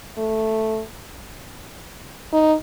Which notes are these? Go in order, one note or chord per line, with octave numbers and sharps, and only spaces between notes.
A3
D#4